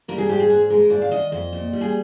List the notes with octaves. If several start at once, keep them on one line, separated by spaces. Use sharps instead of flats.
G3 A#4
G#4
G#2 G4
G#4
G#2
G#3 A#4
G#2 D5
F5
D#3 D#5
F2 D#5
A#2
G3
G#4